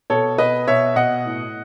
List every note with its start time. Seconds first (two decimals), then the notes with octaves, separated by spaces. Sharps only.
0.10 B2 A4 C#5
0.38 B2 B4 D#5
0.67 B2 C#5 E5
0.96 B2 D#5 F#5
1.25 A2